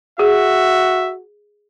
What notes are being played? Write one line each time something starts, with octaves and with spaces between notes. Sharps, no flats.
F#4 G#4 E5